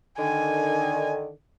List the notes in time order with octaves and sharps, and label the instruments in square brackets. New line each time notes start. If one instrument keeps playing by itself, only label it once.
[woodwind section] D3 D#3 [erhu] G#5